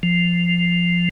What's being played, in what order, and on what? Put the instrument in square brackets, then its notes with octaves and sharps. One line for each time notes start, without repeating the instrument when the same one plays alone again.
[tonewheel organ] F3